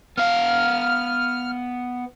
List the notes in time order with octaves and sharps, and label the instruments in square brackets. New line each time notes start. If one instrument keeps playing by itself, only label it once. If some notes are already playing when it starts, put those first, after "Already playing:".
[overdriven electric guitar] B3 F5 [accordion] F6